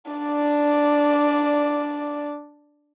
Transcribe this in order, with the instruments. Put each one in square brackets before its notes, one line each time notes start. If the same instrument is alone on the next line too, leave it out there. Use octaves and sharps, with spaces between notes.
[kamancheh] D4 D5